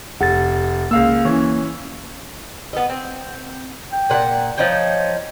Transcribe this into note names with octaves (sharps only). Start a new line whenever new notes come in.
F1 F#5 A6
C#2 A#3 F5 E6
E3 C#4
B3 D#5
C4
G5
A#2 F#5
F3 D#4 C#5 G5